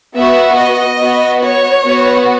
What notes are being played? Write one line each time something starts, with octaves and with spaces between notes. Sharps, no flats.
B3 F#4 E5
D#5
B3 F#4
C#5
B3 F#4